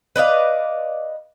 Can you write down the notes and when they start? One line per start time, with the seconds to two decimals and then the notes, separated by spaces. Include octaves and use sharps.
0.16 B4 D5 D#5 F5